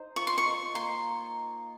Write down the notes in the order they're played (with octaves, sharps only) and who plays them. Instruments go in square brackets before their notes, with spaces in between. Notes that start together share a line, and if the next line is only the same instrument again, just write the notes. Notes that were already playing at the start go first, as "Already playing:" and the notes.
Already playing: [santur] D#4 C5
[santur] F4 [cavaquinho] C#6
[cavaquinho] C6
C#6
[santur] D#5
[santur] A#3 [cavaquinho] C6